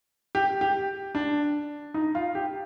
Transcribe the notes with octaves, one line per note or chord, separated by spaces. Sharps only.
G4
G4
D4
D#4
F4
G4